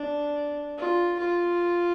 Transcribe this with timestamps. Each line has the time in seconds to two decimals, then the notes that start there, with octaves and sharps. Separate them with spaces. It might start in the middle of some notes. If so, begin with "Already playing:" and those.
Already playing: D4
0.78 F4
1.19 F4